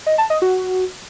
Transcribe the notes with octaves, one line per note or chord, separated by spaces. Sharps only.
D#5
A5
D#5
F#4